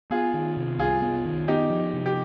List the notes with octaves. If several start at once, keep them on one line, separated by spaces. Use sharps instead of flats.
B3 F4 G#4
D#3
C3
C2 F4 G#4
B3
D#3
B3 D#4 G4
F3
C3
G4